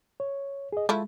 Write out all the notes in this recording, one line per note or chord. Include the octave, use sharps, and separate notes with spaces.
C#5
G#4 D#5
F3 G#3 A3 E4